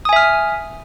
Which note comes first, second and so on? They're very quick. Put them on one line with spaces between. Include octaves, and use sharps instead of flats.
D#6 G#5 E5 F6